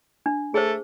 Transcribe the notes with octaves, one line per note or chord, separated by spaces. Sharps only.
D4
A3 G#4 C5